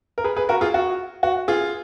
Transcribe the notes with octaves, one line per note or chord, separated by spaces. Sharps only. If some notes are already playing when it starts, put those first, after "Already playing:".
A#4
G#4 B4
G#4 B4
F#4 A#4
F4 G#4
F#4
F#4
F4 G#4